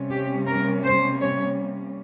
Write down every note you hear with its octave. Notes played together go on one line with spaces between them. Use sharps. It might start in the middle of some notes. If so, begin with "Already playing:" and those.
Already playing: C3 G3 A#3 C#4
G4
A#4
C5
C#5